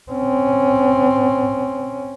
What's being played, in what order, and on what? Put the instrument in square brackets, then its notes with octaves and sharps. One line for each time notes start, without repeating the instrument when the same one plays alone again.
[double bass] C4 C#4